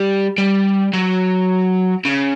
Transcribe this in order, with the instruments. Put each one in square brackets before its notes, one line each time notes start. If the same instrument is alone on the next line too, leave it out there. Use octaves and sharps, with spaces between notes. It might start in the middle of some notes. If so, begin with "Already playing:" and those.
Already playing: [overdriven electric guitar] G3
G3
F#3
C#3